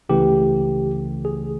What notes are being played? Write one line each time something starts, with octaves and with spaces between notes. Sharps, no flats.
C#2 C#3 E3 A3 G4
G#4